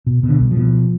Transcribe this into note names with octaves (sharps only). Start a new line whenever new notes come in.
B2
B2
D3
C2
F3
B2